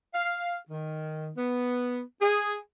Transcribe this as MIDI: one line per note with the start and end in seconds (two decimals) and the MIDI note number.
0.14 0.57 77
0.69 1.31 51
1.37 2.00 59
2.22 2.57 68